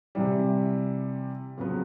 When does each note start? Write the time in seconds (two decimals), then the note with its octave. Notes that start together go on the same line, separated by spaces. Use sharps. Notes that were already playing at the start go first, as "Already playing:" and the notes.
0.15 C3 E3 G3
1.57 F2 C#3 F#3 B3